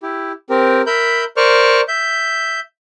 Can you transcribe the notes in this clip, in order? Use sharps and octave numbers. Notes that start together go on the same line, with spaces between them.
E4 G4
C4 G4 A#4
A#4 E5 B5 G6
A#4 C5 D5 C#6 F6
E5 G6